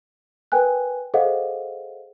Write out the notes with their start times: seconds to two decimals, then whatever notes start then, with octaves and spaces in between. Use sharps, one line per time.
0.52 A#4 B4 G5 G#5 F#6
1.14 G#4 A4 C5 D#5 F5 F#5